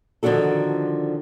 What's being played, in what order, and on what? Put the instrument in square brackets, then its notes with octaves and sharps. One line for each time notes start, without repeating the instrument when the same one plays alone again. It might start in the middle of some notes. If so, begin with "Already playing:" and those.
[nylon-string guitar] D3 D#3 F3 D4 F#4 A4